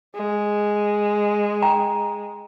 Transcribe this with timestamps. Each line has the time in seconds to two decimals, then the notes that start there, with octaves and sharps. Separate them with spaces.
0.15 G#3
1.62 G5 A#5